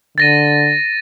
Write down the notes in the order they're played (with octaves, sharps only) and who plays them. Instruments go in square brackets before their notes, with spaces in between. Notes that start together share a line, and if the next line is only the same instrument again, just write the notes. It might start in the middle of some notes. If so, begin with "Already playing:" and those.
[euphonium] D3 [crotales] A6 A#6 D#7